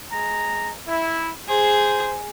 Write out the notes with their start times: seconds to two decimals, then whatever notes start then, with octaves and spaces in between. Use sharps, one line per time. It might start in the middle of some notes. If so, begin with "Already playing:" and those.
0.11 G#3 A#5
0.87 E4
1.48 G#4 C5